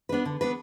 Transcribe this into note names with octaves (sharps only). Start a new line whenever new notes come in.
B3 D4 B4
D3
B3 D4 B4